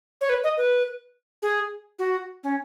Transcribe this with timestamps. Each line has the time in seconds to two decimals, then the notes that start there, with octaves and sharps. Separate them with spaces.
0.21 C#5
0.29 B4
0.44 D#5
0.57 B4
1.42 G#4
1.99 F#4
2.44 C#4